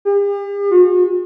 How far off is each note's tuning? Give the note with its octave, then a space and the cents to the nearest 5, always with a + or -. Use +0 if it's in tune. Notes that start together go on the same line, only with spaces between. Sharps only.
G4 +45
F#4 -45